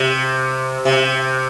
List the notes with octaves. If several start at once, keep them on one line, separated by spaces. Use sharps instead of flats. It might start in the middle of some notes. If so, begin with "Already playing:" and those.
Already playing: C3
C3